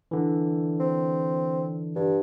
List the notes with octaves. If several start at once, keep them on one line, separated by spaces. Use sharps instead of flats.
D3 E3
C4
G2